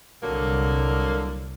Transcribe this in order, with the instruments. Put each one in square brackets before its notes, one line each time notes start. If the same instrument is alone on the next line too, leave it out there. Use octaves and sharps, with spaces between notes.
[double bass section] C2 [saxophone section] D3 F#3 A#3